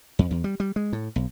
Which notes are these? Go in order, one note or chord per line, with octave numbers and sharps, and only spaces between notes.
F2
E2
G3
G3
G#3
A2
B1